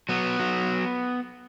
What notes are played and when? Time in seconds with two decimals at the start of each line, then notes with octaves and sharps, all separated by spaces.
0.09 F#3 B3
0.39 F#3